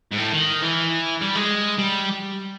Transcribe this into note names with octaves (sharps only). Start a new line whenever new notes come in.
G#2
A2
D#3
E3
G3
G#3
G3